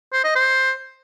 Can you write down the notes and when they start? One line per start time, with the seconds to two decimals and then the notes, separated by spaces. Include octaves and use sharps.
0.13 C5
0.24 D#5
0.35 C5